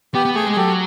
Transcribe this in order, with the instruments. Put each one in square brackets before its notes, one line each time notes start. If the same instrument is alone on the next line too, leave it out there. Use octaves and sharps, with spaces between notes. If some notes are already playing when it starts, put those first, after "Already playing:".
[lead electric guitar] B3 [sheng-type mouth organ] G4
[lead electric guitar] B3
[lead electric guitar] A3 [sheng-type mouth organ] G#4
[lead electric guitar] G#3
[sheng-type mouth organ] G#4
[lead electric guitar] F#3 [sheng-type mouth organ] G4 A4